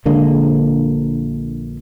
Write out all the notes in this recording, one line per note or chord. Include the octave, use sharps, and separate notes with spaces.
A#1 D3 G#3 A#3